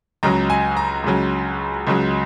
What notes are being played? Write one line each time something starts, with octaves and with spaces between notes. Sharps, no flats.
C#2 C#3 F#3 A#5
G#5
A#5
C#2 C#3 F#3
C#2 C#3 F#3